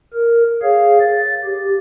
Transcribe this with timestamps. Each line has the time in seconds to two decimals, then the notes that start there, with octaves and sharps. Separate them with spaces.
0.14 A#4
0.62 G#4 C#5 F5
0.99 A6
1.45 G4